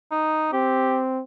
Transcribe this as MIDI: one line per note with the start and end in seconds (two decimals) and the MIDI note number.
0.11 0.51 63
0.53 1.21 60
0.53 1.01 67